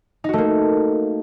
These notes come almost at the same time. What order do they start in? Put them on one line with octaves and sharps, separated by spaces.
D#4 F#4 A3 A#3